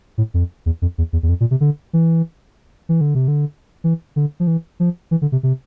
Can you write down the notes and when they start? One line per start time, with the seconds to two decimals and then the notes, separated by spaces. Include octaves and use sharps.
0.18 A2
0.34 F2
0.66 E2
0.82 F2
0.98 E2
1.13 E2
1.23 E2
1.29 F2
1.40 A#2
1.51 C3
1.61 D3
1.93 E3
2.89 E3
3.01 D3
3.15 C3
3.28 D3
3.84 E3
4.16 D3
4.40 F3
4.47 E3
4.80 F3
5.11 E3
5.22 D3
5.32 C3
5.43 C3